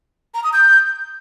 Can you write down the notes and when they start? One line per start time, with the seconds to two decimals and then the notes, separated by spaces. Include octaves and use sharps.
0.34 A#5
0.44 D#6
0.53 G6